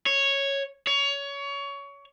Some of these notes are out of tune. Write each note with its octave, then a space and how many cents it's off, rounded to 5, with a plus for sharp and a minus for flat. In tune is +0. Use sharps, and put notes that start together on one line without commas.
C#5 -5
C#5 +20